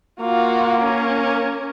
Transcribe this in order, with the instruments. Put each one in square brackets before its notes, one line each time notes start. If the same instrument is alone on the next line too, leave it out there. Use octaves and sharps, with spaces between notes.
[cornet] A#3 [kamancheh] F4 F#4
[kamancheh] C#4 A#4